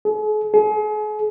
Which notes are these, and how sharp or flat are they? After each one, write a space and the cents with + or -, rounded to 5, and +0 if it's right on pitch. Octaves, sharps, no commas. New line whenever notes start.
G#4 +45
G#4 +40